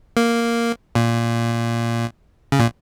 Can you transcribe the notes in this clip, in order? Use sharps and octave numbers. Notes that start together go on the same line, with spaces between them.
A#3
A#2
C#3
A#2